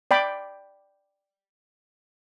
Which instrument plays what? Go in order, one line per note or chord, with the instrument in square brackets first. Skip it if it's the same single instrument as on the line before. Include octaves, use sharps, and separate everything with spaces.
[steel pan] D5 G5 B5 D6